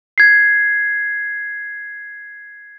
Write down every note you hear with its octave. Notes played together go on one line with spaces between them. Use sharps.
G#6 C7